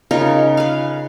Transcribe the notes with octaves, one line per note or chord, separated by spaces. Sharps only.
C#3 D#4 F4 A#4
B4 F5